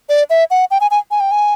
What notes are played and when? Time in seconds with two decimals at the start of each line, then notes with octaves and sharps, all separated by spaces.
0.09 D5
0.30 E5
0.51 F#5
0.71 G5
0.81 G#5
0.91 G#5
1.11 G#5
1.20 G5
1.31 G#5